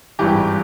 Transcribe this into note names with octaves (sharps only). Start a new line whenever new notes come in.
G#1 G2 E3 G4